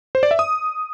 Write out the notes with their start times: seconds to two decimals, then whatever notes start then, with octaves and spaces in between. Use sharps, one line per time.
0.15 C5
0.23 D5
0.31 E5
0.39 D#6